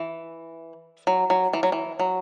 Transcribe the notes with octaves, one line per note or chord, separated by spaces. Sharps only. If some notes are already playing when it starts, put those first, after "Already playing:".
Already playing: E3
F#3
F#3
E3
F#3
E3
F#3